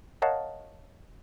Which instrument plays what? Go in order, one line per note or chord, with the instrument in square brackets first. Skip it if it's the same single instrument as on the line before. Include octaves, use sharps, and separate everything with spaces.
[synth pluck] A#4 C#5 D#5 F5 F#5 A5